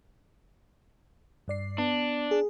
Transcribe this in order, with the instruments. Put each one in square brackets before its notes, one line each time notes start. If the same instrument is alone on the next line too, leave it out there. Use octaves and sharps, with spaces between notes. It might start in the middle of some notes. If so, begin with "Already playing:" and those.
[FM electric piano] G2 D5 C7
[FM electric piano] B3 [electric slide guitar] D4
[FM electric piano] G#4